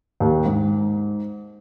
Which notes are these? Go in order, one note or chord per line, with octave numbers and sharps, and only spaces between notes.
D#2
G#2